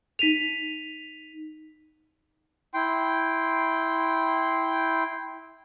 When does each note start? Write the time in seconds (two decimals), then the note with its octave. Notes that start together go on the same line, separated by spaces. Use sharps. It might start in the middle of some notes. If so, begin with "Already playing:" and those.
0.19 D#4 B6 D#7 F7
2.74 E4 G5 C6